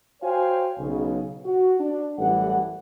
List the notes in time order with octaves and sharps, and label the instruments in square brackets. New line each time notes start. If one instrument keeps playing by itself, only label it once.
[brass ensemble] F#4 C5 C#5 F5 G5 G#5
B1 C#3
F#4
D4
A1 F#2 E3 G3 A4 F#5